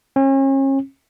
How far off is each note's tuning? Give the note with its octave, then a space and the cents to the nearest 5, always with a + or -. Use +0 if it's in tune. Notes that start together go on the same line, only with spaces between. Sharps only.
C#4 -40